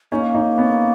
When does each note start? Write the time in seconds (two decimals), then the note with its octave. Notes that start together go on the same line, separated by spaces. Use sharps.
0.12 B3 C#4 D#4
0.15 A#3
0.35 C#4 D#4
0.58 B3 C#4